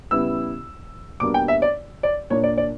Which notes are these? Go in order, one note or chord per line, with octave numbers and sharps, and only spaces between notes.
C#3 G3 B3 E4 E6
B2 G3 A#3 D4 D6
G5
E5
D5
D5
A#2 A#3 D4 C#5
D5
D5